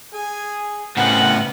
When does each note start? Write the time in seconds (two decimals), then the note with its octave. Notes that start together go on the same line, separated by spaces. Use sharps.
0.13 G#4 G#5
0.97 A2 C#3 B3 C4 A#4 F#5